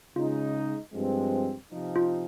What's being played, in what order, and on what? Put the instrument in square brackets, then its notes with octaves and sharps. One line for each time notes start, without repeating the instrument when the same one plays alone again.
[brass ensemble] C#3 G#3 D#4 [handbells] F4
[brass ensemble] G2 F3 G#3 C4
C3 F3 C4 D#4
[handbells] F4